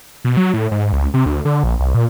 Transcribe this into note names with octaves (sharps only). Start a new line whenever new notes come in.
B2
F#3
A2
G#2
C#2
C3
D2
D3
A#1
C2
A#2